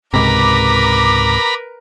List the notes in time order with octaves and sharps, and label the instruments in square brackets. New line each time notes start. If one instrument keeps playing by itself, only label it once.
[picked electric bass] C#2 G#2 C3 [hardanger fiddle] A#4 B4 [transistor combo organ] A#5 B5 [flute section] D6